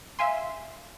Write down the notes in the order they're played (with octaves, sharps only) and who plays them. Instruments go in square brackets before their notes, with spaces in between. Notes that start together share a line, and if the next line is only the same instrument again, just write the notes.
[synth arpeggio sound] E5 F5 G#5 C6